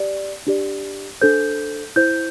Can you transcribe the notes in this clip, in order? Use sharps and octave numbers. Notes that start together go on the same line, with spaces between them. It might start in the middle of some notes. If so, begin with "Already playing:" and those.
Already playing: G4 D5
D4 G4 D5
D4 A4 C5 G6
E4 C5 G6